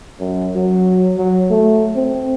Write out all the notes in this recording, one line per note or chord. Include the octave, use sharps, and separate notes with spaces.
F#2
F#3
F#3
A3
C4